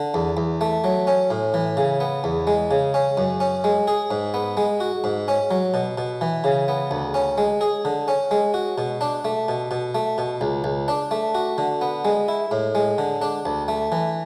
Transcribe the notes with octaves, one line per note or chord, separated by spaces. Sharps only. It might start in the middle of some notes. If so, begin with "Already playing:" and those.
Already playing: D3
E2
E2
A3
F#3
C#4
A2
E3
C#3
B3
E2
G#3
C#3
C#4
F#2
C#4
G#3
G#4
G#2
B3
G#3
F#4
G#2
C#4
F#3
B2
B2
E3
C#3
B3
D2
C#4
G#3
G#4
D3
C#4
G#3
F#4
B2
D4
A3
B2
B2
A3
B2
C#2
C#2
D4
A3
F#4
D3
B3
G#3
E4
A2
G#3
D3
D4
D2
A3
E3